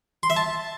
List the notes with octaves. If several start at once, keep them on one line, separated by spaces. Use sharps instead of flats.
C6
E5
A5